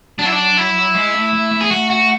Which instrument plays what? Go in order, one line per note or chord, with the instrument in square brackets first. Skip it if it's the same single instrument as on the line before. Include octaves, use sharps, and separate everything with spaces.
[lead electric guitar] F#3 [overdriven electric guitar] D4
[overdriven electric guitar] E4
D4
E4
[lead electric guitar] G#3
A3
A3
A3
[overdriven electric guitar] G#4
[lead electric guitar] A3 [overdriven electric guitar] F#4
[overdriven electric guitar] F#4